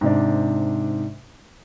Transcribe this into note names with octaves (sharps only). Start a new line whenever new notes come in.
G#2 C3 D4